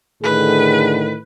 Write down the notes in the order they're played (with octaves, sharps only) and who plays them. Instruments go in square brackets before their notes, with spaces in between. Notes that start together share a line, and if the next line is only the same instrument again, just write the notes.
[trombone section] A2 D3 D#3 [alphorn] G#4 [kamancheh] B4